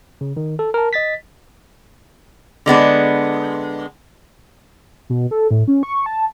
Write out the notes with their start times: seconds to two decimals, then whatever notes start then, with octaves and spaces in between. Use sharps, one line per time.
0.21 C#3
0.37 D#3
0.59 A4
0.74 A#4 A5
0.93 D#5 A6 B6
2.66 D3 G#3 B3 D4
5.10 B2
5.31 A4
5.51 A2
5.68 C#4
5.83 C#6
6.06 A5